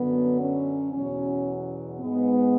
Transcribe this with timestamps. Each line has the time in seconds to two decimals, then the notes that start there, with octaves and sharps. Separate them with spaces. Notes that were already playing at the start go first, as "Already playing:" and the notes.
Already playing: F#2 D3 F#3 B3
0.41 C#4
0.93 E2 B2 F#3 C#4
2.01 G#2 G#3 B3